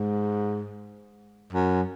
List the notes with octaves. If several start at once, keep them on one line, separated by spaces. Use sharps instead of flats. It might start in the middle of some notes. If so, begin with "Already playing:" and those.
Already playing: G#2
F#2